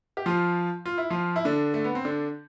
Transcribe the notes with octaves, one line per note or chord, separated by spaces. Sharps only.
G4
F3 F4
F4
E4
F3 F4
E4
D3 D4
A3
B3
C4
D3 D4